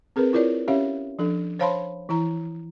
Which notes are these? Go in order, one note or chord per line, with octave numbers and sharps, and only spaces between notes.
C4 G#4 A#4 B4
E4 F4 A#4 C#5 D5
C#4 G4 C#5 E5 F5
F3 D4 A4
C5 C#5 F5 A5 B5 C6
E3 E4 A#5